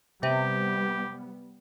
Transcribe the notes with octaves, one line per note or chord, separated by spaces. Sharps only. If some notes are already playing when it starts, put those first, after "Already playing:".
C3 G3 B3 G4